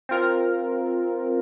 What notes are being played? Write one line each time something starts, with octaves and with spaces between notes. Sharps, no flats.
C4 F4 A#4